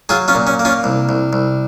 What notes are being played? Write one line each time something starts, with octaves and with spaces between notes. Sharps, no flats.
F#3 F4 G#4
C#4 F4
A#2
C#4
A#3
C#4 F4
C2
C2
C2